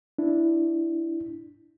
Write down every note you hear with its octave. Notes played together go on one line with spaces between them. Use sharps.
D4 E4